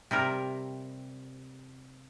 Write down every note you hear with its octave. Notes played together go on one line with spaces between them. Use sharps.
C3 G3 A#4 E5